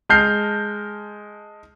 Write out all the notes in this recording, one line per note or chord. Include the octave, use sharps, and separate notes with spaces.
G#3 A5 F6 G6 C7